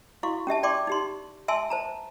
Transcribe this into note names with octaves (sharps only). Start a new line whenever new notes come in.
E4 F#4 F5 C#6
C#4 G4 E5 A5
D5 G5 C6 D6
D#4 G4 C6
E5 G#5 A5 C6 E6
C5 A5 A#5